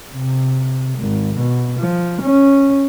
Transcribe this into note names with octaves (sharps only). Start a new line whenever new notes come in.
C3
G#1
B2
F3
C#4